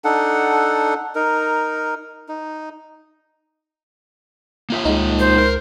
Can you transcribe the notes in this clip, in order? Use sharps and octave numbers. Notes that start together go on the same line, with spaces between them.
D4 D#4 A4 F#5
D#4 A#4
D#4
A#3 F4 E5
C#2 G#3 D#4
C5
A#4